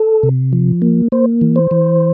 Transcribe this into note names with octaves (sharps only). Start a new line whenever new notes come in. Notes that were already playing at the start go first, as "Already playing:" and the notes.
Already playing: A4
C3
F3
A#3
A#3 C5
E3
C5
E3